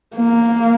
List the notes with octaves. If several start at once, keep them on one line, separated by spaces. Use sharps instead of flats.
A#3